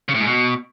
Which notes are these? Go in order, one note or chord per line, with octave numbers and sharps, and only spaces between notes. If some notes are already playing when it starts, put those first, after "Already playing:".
C#3
A2
G#2
B2